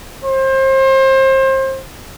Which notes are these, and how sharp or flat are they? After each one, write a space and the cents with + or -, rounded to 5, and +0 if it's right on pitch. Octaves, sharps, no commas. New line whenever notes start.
C5 +30